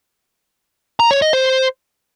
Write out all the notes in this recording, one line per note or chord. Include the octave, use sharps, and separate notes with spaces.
A#5
C#5
D#5
C5